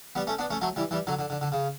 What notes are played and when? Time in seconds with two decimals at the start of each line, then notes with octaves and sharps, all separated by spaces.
0.15 G3 B3
0.27 A3 C#4
0.39 B3 D4
0.51 A3 C#4
0.61 F#3 A3
0.76 E3 G3
0.91 E3 G3
1.07 D3 F#3
1.19 D3
1.30 D3
1.41 D3
1.52 C#3